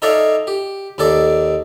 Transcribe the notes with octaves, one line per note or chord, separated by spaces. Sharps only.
D#4 A4 C#5 D5 E5 F5
G4
D#2 D#3 A4 D5 D6